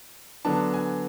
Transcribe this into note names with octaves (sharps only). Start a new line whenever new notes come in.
D3 F#3 B3 D4 A5
G#5